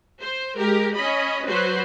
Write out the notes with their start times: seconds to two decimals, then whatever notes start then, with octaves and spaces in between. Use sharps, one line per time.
0.20 C5
0.56 G#3 G4 A#4
0.93 C#4 D#5 B5
1.45 F#3 F#4 B4 C5